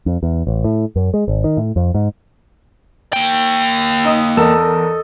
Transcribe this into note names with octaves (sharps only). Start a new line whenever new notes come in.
F2
E2
A1
A2
F#2
G#3
G#1
D#3
A2
F2
G#2
A#3 G5
D#4 D#6
E2 A4 A#4 D#5 E7